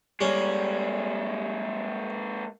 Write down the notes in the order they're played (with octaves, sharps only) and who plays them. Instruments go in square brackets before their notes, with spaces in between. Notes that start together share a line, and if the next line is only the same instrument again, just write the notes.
[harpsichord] G3 C#4 [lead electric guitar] G#3 A#3